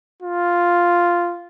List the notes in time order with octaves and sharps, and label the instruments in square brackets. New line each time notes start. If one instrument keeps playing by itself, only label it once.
[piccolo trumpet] F4